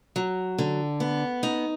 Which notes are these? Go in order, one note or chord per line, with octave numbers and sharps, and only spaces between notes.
F#3
D3
B3
D#4